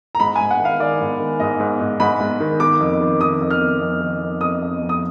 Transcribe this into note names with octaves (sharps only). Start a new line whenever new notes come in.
A#5
G#2 B5
G#5
G#2
F#5
D#3
F5
D#3 D5
G#2
D#3
G#2 D#5
G#2
G#2
G#2 B5
G#2
D#3
D#3 D6
F2
D#3
D#3 D#6
F2
F6
D#3
F2
D#3
F2
F2 D#6
F2
F2
D#6